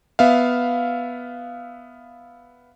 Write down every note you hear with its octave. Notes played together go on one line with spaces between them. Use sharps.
B3 E5 F5